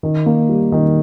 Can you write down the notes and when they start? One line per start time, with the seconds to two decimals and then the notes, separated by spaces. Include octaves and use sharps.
0.03 D#3
0.26 A#3
0.49 G3
0.72 D#3